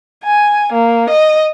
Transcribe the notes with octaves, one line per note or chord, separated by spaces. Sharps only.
G#5
A#3
D#5